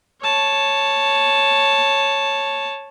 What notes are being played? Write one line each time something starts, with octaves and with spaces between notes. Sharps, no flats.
C#5 A5